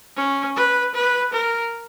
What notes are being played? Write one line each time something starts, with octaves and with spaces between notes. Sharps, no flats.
C#4
B4
B4
A#4